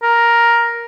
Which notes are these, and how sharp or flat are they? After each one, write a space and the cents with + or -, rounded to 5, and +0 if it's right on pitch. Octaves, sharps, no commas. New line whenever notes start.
A#4 +5